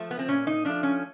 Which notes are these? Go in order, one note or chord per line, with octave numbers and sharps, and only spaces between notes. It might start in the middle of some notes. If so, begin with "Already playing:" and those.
Already playing: F3 A3
B3
C4
A#2 C#4
D#4
F3 A3 D4
C#4